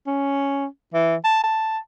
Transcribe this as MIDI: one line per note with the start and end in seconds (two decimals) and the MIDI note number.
0.07 0.66 61
0.94 1.16 52
1.24 1.41 81
1.44 1.79 81